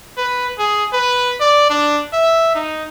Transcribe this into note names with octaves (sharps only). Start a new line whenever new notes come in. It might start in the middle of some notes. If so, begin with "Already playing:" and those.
B4
G#4
B4
D5
D4
E5
D#4